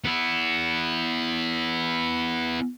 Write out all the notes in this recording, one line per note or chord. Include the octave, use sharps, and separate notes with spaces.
B3 E4